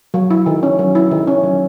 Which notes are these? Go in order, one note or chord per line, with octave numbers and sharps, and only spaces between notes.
F#3
E4
D#3
C#4
F#3
E4
D#3
C#4
F#3